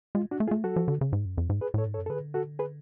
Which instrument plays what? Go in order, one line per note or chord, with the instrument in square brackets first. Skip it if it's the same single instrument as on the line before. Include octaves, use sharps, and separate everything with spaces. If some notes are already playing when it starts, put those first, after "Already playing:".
[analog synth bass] G#3 [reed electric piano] F4
[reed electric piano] D4 F#4
[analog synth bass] A3
[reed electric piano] F4 G#4
[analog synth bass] A3
[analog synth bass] F#3 [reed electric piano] F#4 A4
[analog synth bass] F3
D3
C#3
G#2
F#2
F2
G#2
[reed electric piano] G#4 B4
[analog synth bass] A2 [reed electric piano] A4 C#5
[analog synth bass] G#2
[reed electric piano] A4 C#5
[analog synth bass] F#2
[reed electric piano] A4
[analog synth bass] D3 [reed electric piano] G#4 B4
[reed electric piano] F#4 A4
G#4 B4